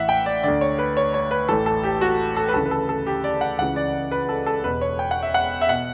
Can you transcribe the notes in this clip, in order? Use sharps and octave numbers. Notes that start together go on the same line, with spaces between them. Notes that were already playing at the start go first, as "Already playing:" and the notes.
Already playing: A1 A2 E3 E5 F#5
G5
D5
D2 D3 D5
C#5
B4
C#5
C#5
B4
A1 A2 E3 A4
A4
G4
F#4
A4
B4
D2 C#3 E3 A4
B4
A4
A4
G4
D5
F#5
C#2 C#3 E3 F#5
D5
B4
A4
A4
E1 E2 B2 B4
C#5
G5
F#5
E5
F#5
E5
B2 F#5